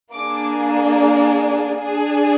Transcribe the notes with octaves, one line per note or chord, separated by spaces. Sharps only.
A#3 D4 G#4 D6
D4 G#4